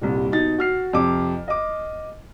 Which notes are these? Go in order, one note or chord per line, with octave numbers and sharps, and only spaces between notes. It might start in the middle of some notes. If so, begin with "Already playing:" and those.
D#1 C2
B2 D#4 A6
F#4 F6 C7
F2 C3 D6
D#5 D6